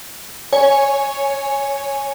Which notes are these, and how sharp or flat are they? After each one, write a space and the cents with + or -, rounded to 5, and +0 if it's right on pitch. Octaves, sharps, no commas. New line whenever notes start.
C#5 +0 G#5 +0